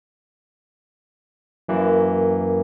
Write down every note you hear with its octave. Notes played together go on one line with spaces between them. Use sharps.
F#2 E3 A#3